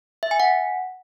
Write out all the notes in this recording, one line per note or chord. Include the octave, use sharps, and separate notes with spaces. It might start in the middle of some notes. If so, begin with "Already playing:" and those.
E5
G#5
F#5